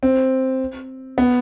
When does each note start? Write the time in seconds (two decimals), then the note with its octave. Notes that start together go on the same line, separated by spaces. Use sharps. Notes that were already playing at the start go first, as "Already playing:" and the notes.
0.03 C4
1.18 B3